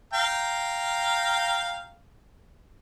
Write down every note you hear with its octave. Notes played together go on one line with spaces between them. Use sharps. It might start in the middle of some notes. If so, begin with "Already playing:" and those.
F5 G5 A#5